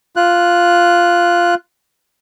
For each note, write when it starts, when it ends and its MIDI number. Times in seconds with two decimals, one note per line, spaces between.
0.16 1.55 65
0.16 1.55 90